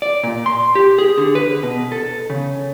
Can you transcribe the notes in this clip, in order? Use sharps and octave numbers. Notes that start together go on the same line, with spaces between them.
D5
A#2
C6
G4
G#4
D3
B4
B2
A4
C#3